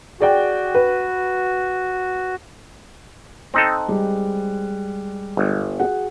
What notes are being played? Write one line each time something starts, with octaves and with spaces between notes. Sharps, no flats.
F#4 G#4 D5 G5
B4
C4 D#4 A4 G5 D#6 F#6
G3 G#3
G1
F#4 G#4 F#5